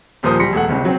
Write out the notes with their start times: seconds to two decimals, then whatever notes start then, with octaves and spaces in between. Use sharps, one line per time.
0.23 D#1 A#2 F3 A#4 C5 D#6
0.40 D1 G3 C6 A#6 B6 C#7
0.53 E1 A3 F#5
0.69 G1 C#2 C3
0.85 F#3 C4